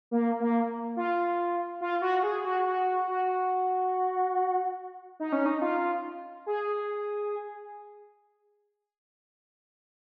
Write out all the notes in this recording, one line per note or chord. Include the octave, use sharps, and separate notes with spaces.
A#3
A#3
F4
F4
F#4
G#4
F#4
F#4
F#4
D#4
C#4
D#4
F4
G#4